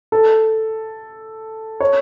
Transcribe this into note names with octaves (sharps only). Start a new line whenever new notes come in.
A4
C#5